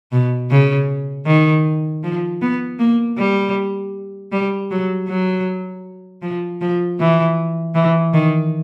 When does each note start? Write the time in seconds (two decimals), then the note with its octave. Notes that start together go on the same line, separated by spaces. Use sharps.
0.12 B2
0.51 C#3
1.26 D#3
2.04 F3
2.42 B3
2.79 A#3
3.18 G3
4.32 G3
4.71 F#3
5.08 F#3
6.22 F3
6.61 F3
7.00 E3
7.75 E3
8.13 D#3